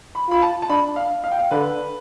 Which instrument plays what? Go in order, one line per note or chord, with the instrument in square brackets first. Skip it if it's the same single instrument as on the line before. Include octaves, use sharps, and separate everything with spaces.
[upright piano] B5
[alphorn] F4 [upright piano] B5
[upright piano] A5
A5
[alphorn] D4 [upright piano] B5
[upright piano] F5
F5
G5
F5
[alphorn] D3 [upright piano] B4